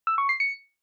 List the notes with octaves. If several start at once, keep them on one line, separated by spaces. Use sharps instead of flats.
E6
C#6
C7
C#7